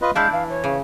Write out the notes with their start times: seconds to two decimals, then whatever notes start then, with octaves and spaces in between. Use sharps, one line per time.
0.02 F4 B4 D#5
0.15 G#3 D4 E4 D5 F5 G6
0.32 E3 F5
0.49 C#5
0.64 C#3